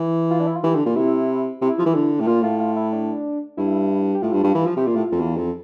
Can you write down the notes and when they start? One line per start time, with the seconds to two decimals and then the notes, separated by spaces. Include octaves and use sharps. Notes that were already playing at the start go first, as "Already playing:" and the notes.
Already playing: E3
0.31 F4
0.40 D4
0.47 E4
0.56 F4
0.63 E3 G4
0.75 D3
0.85 A#2
0.96 C3 E4
1.61 C3 E4
1.78 F3
1.86 E3
1.94 D3
2.20 A2
2.27 A#2 F4
2.43 A2 F4
2.60 F4
2.76 E4
2.93 D4
3.57 G2 E4
4.14 G4
4.22 A2 F4
4.32 G2
4.43 G2
4.54 E3
4.66 F3
4.77 C3 G4
4.87 A#2 F4
4.96 A2
5.12 F2
5.20 E2
5.37 F2